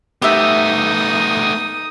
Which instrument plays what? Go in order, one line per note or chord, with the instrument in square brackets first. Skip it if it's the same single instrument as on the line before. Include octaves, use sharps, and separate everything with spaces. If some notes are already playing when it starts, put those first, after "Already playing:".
[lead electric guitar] A3 B3 [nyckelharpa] D#4 D#6 [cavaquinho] G4 E5